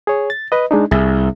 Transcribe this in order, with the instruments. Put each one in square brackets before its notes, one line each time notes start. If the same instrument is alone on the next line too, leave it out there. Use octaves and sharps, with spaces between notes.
[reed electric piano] G#4 C#5
A6
B4 D#5
G#3 D4 D#4
[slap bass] C2 [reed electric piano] G#4 E5